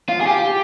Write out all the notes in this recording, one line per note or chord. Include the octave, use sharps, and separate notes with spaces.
F4
G#4
G4